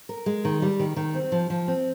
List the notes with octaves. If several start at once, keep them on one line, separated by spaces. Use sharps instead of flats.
A#4
G#3
D#3
G3
D#3
D#3
C4
F3
F3
C4